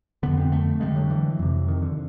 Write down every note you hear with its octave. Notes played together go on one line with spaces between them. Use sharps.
F2 D3 B3
C4
A3
G2 D3 G#3
F#3
E3
F2 C3
D#3
D3